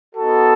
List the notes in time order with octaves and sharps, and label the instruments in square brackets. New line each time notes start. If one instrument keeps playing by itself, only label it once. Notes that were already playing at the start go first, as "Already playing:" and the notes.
[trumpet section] B3 D#4 F#4 A4